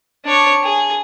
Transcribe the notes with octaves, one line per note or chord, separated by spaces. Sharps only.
D4 C#5
G#4